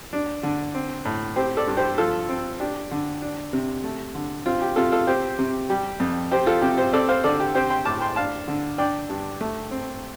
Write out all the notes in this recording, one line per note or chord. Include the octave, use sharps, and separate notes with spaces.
D4
D3
C4
A2
C4 G4 C5
A4 D5
G2
G4 C5
F3 F4 A4
C4
D4 G4
D3
D4
C3
A3
D3
C4 F4
G4
C3 F4 A4
F4 A4
C4 G4 C5
C3
G3 G4
F2
C4 G4 C5
F4 A4
C3 G4
G4 C5
C4 A4 D5
C5 F5
D3 A4 D5
G4
C4 G4 C5
G5 C6
A2 A5 D6
G5 C6
D4 F5 A5
D3
D4 D5 G5
G2
A3
C4